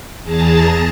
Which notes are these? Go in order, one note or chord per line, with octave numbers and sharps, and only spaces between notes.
E2 G#4 A5 A#5 A6